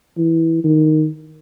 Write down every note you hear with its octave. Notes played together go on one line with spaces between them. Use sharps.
E3
D#3